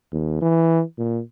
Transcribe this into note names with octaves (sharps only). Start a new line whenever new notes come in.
D#2
E3
A#2